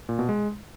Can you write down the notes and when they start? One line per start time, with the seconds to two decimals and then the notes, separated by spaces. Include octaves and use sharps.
0.09 A#2
0.19 B2
0.29 G#3